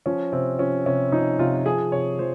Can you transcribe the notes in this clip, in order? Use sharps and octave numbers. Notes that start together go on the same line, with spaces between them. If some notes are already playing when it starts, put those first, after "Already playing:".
F3 C#4
C3 C4
F3 C#4
C3 C#4
F3 D#4
C3 F4
F3 G#4
C3 C#5
F3 C5